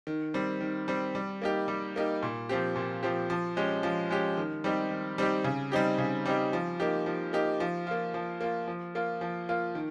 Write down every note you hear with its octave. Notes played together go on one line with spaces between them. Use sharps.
D#3
G3 C4
D#3
G3 C4
G3
A#3 D#4 G4
G3
A#3 D#4 G4
A#2
F3 C4 G4
A#2
F3 C4 G4
F3
G#3 C#4 G4
F3
G#3 C#4 G4
D#3
G3 C4 D#4 G4
D#3
G3 C4 D#4 G4
C#3
G3 C4 D#4 G4
C#3
G3 C4 D#4 G4
F3
A#3 D#4 G4
F3
A#3 D#4 G4
F3
A#3 F4
F3
A#3 F4
F3
A#3 F4
F3
A#3 F4
D#3